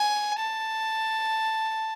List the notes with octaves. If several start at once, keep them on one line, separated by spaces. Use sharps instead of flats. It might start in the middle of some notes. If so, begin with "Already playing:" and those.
Already playing: G#5
A5